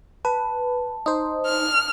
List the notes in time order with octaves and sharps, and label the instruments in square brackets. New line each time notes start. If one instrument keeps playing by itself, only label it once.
[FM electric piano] B4 [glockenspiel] A5
[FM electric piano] D#4 C5 [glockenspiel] D#6
[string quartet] F6